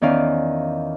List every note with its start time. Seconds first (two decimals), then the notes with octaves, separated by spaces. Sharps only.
0.01 E2 D#3 C#4 D5 F5